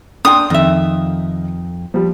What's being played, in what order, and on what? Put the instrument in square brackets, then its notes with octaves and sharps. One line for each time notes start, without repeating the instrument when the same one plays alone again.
[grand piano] D4 G5 C6 [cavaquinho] D#6
[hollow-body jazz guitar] F2 E5 [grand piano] D#3
[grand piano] F3 G3